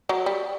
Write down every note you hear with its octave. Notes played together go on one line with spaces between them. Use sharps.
F#3
G3